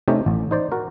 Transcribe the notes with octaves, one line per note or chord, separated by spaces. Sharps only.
C3 A3 C4 C#4 D#4 G4
A1
D#4 C5 D5
F#4 A#4